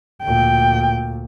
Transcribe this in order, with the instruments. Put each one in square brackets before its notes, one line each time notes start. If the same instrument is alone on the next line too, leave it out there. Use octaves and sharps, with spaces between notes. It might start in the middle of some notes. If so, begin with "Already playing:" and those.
[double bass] D2 A#2 [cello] G5